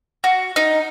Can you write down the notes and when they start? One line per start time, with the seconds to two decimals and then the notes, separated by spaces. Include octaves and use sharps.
0.24 F#4
0.56 D#4